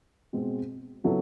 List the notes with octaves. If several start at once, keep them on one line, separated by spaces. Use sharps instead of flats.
B2 G#3 C4
C#3 F#3 B3 E4 A4